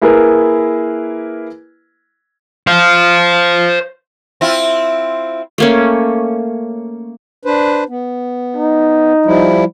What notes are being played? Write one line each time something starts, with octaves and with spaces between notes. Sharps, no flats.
A#3 E4 G#4 A#4 B4
C5 F5
C4 E4 F4
A3 A#3 C#4
D4 B4 C5
B3
D#4
F3 G3 E4